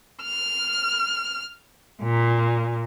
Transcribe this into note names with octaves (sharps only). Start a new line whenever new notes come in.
F6
A#2